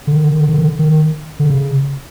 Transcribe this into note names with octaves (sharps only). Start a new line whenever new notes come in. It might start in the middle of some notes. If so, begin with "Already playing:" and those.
D3
D#3
D3
D#3
D3
D#3
D3
D#3
D3
C#3